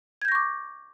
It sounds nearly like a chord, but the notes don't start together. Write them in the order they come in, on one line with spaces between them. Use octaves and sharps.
G#6 G6 A#6 C#6 D6